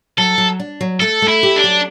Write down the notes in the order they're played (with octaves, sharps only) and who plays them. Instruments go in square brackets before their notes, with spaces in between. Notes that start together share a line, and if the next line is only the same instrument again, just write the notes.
[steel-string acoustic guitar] F#3 [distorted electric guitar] A4
[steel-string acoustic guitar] F#3
D4
F#3
[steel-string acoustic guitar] A3 [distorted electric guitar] A4
[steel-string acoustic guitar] A3
[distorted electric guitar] E4
[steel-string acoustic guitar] G4
[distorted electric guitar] D4
[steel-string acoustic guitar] F#3